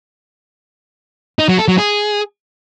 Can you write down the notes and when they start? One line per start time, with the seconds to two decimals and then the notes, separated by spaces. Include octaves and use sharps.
1.39 D#4
1.49 F#3
1.58 A4
1.68 F#3
1.78 G#4